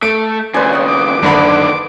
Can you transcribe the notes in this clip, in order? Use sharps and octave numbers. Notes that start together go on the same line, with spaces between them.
A3 D7
D#2 C#3 B4 C5 D5 G#5
C#5 F#5 D#6
D6
F#1 D3 D#3 D4 B5